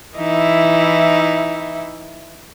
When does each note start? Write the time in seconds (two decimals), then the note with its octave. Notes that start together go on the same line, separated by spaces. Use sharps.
0.17 E3 D#4 E4